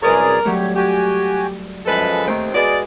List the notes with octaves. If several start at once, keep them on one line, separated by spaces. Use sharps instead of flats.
C2 F#2 G#4 A#4 B4 C#5 D5
F#3 G3 A3 G4 C#5
F#4 G4 G5 G#5
F#2 F3 G#3 A4 B4
D#2 D#3 A3 C4
G#3 F#4 G#4 B4 D5